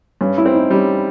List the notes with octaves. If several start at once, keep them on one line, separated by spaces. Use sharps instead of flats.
G2 C#4
E4
C4
D#4
G3 C#4